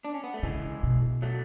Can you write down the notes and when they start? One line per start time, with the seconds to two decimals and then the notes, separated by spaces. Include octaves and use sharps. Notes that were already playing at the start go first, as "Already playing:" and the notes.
0.05 D4
0.14 C#4
0.24 B3
0.34 A3
0.43 C#3 E3 G#3
0.83 B2
1.22 F#3 A3